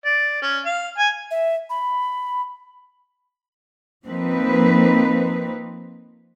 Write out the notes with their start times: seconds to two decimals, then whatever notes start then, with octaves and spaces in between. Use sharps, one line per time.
0.05 D5
0.42 C#4
0.65 F5
0.98 G#5
1.31 E5
1.70 B5
4.05 F3 A#3 C4 D#4 B4